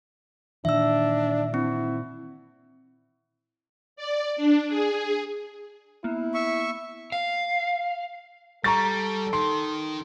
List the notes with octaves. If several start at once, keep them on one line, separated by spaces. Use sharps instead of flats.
A#2 D#3 E3 D4 E5 E6
C4 E4
D5
D4
G#4
A#3 B3 E4
E5 C#6
F5
G3 A4 A#5 C#6 A6
D#3 C6